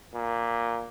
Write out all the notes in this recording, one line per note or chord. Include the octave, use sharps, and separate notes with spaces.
A#2